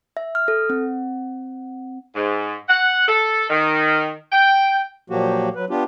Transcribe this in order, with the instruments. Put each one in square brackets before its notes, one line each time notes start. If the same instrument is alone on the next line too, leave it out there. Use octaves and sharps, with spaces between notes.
[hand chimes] E5
F6
A4
C4
[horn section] G#2
F#5
A4
D#3
G5
[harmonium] A#2 F3 F#3 A#3 F#4 G4
F#3 B4
B3 D4 F4 G4